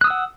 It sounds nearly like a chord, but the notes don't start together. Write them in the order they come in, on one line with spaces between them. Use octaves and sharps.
F#6 D#6 E6 F#5